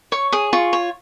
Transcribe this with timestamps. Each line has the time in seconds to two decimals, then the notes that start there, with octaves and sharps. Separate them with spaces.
0.12 C#5 C#6
0.32 G#4 D#6
0.53 F4 C#6
0.73 C#5